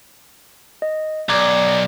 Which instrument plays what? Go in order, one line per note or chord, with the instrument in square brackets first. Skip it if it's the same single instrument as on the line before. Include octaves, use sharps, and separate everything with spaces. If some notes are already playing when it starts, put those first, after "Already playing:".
[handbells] D#5
[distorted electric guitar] B1 [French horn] D5 [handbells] A#5 D6 G#6